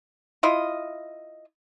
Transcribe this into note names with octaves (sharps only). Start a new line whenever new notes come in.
E4 F4 D#5